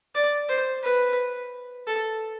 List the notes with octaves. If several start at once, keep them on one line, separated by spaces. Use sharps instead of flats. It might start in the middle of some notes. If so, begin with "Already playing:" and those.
D5
C5
B4
A4